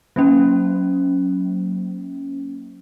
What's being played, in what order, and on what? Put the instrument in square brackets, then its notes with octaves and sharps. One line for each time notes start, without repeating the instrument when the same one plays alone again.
[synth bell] F#3 A#3 C#4